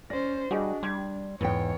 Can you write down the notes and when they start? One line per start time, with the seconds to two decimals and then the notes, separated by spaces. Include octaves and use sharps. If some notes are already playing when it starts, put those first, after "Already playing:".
0.10 C#4 C5 D5 A#6
0.51 G3 D4 F#4 G#4 D#5
0.83 G3 C6 G#6
1.41 E2 G#2 C#5 G5